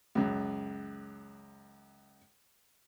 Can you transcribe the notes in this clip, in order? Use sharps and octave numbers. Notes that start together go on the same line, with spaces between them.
C#2 F#2